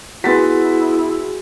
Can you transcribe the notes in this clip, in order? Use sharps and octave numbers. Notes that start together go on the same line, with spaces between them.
B3 E4 F#4 G#4 C6 A6 B6